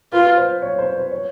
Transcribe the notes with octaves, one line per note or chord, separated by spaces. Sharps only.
F4 B4
C5
C#5
C5
C5
C#5